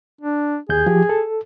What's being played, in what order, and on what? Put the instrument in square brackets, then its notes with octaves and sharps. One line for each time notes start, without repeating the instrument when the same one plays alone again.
[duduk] D4
[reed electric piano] D#2 G6 [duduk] G#4
[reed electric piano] F3 G4
A4